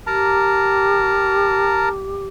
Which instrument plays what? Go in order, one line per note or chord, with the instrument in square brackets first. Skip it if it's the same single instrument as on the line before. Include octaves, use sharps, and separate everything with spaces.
[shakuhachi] G4 [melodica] A#4 A5 A#5